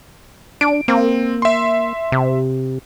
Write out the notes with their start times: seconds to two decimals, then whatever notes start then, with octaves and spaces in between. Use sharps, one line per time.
0.61 D4 D7
0.88 A#3 C4
1.42 E5 C6
2.12 C3